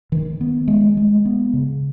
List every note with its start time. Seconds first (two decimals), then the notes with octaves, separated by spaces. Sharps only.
0.12 D#3
0.41 B3
0.68 G#3
0.97 G#3
1.25 B3
1.53 C#3